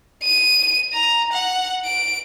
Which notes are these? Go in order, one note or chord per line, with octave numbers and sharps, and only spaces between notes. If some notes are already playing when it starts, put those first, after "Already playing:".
D#7
A#5
F#5
D7